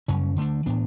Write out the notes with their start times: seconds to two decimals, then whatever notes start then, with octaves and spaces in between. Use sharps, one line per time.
0.08 F#2 C#3 G3 C#4
0.36 D3 A3 D4
0.66 A2 E3 B3 D4